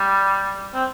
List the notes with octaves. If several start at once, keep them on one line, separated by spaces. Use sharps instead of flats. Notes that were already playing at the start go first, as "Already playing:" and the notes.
Already playing: G3
C4